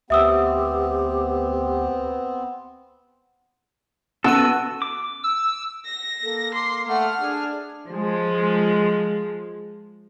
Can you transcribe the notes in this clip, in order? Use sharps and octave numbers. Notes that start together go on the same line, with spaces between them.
D2 B3 C4 G4 E5 D#6 E6
B3 C#4 F#4 A4 E6 D#7
D6
E6
A#6
A#3 A4
C6 D6
A3 F#5 F6
D4 G#4
F3 G#3